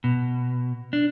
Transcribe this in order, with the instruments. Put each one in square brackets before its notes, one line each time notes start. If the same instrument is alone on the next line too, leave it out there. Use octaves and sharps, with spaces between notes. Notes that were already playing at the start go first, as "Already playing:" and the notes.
[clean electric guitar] B2
D4